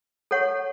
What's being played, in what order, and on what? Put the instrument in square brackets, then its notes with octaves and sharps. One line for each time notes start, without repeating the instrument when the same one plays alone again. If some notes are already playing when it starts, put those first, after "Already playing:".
[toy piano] A4 C#5 F#5 C#6